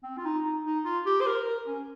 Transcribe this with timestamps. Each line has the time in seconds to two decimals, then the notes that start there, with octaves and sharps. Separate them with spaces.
0.03 C4
0.18 F4
0.25 D#4
0.44 D#4
0.65 D#4
0.85 F4
1.05 G4
1.21 C5
1.26 A#4
1.46 A#4
1.67 C#4